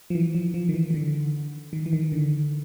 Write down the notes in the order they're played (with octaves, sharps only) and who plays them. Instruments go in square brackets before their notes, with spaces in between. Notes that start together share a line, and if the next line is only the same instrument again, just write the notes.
[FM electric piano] F3
E3
F3
F3
D#3
E3
D#3
D3
D#3
E3
D#3
D3